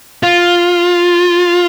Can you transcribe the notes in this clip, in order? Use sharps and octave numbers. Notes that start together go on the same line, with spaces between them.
F4